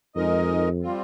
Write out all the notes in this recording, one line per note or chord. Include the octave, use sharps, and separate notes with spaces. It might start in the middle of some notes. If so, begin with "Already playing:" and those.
F2 G#3 D#4 A#4 D#5
G3 C4 F4